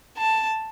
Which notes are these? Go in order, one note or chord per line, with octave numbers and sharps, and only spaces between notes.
A5